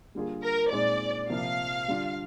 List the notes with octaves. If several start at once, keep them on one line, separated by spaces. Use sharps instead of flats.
D3 G3 A#3 F4 G#4
A#4
A#2 G#3 C4 D#4 D5
C3 F3 A#3 F5
D3 G3 D4 F4